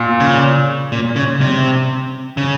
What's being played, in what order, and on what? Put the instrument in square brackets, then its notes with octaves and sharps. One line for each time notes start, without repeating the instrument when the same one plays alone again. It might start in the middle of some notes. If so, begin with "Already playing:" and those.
Already playing: [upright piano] A#2
[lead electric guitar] C#3
A#2
C#3
C3
C#3